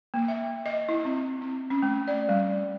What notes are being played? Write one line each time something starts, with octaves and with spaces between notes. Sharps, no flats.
A#3
E5
D#5
E4
C4
C4
C#4
A3
D5
G3